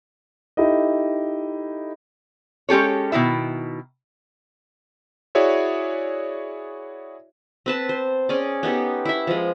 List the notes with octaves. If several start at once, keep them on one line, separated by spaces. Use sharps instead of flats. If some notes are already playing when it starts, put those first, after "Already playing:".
D#4 E4 G4 A4 D#5
G#3 C#4 G4 A4 C#5
B2 D#3 E4 E5
E4 F#4 G#4 C#5 D5 E5
C4 B4 A5
C5
C#4 G#4 D5
B3 D#4 G4 A4
E4 E5
F3 G#3